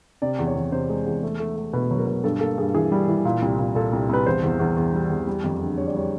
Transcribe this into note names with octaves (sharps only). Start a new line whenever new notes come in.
C3 D5
E2
C#5
E2
C3 C5
G#3
E2
A3
A3
A3
B2 B4
F#3
A#4
B2
G2 A4
A#3 A4
G2 G#4
E3 G#4
G3
E3
A#2
C2
A#2
A#2 A4
C2
C2 B4
E2 C5
E2
E2
E2
G3
E2
G3
F2
D3
G3 C#5
D5
G3 C#5